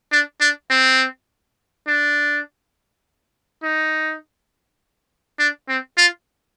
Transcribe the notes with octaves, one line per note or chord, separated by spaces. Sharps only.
D4
D4
C4
D4
D#4
D4
C4
F4